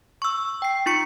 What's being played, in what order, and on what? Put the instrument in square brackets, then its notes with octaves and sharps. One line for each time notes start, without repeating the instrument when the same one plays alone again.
[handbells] C#6 E6
G5 C7
D#4 F4 C#6 C#7